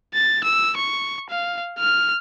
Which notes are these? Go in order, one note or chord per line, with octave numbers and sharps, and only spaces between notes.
A6
E6
C#6
F5
F6